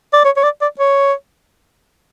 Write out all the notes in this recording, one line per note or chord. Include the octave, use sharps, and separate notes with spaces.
D5
C#5
C#5
D5
D5
C#5